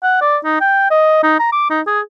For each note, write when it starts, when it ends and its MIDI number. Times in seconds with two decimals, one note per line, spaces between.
0.03 0.21 78
0.21 0.37 74
0.44 0.58 63
0.61 0.90 79
0.91 1.22 75
1.23 1.37 63
1.39 1.49 82
1.52 1.66 86
1.70 1.81 63
1.87 2.00 68